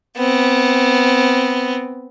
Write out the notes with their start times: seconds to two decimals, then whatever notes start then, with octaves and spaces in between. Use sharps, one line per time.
0.17 B3 C4